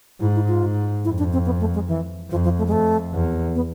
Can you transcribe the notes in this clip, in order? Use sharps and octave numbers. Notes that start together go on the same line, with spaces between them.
G#2 E4
E4
F4
G#2
F2 E4
D4
C4
B3
A3
G#3
E3
F2 F3
F3
A3
G#3
F2 A3
E2
B3